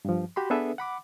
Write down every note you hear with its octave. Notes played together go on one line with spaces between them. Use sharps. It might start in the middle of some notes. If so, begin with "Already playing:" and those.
G2 F3
F#4 G4 B5 C6
B3 D4 G#4 A4 B4 E5
F#5 B5 D6